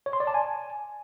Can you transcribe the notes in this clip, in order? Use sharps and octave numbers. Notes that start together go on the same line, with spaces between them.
C#5
C6
D5
A5
G#5